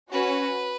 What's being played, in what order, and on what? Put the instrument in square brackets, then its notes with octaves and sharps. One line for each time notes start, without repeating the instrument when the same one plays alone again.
[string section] C#4 F#4 [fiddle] B4